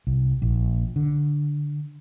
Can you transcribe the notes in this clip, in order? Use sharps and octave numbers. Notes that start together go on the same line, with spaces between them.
C2
A#1
D3